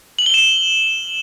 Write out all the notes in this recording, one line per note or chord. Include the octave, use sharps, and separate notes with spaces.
F#7
G7
E7